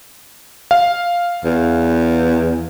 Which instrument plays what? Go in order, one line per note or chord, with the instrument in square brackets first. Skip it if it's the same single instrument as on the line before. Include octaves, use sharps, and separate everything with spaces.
[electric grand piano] F5
[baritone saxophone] E2